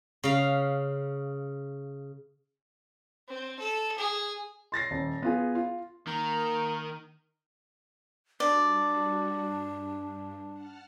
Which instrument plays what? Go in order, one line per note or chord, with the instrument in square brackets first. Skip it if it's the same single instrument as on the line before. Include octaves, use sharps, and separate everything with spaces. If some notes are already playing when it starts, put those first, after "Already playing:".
[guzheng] C#3 F5
[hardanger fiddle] C4
A4
G#4
[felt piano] C6 A6 A#6 C7
D#1
B3 F4 G#4
F4
[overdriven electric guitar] D#3 [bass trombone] A#3 [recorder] A#5
[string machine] G3 F#4 [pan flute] D4 [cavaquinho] D5
[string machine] G2
F#5 A5 F6